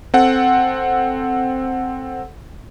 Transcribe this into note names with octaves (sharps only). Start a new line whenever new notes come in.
C4 A4 F#5